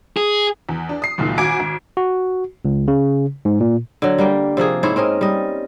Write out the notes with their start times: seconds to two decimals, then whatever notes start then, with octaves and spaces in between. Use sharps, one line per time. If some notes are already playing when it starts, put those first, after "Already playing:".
0.17 G#4
0.69 E2
0.89 D4
1.02 D#6 C7
1.18 F#1 C#2 A#2 D#3
1.38 G#1 F#4 G#5 D6 G#6 D7
1.60 G#1
1.97 F#4
2.65 C#2
2.88 C#3
3.45 G#2
3.61 A#2
4.02 D3 F#3
4.18 G3 A#3 G5
4.57 C3 F3 A#3 G#4
4.83 G#2 E4 C5 C#5
4.96 C4 C#4 A#4 D#5
5.21 G3 D#5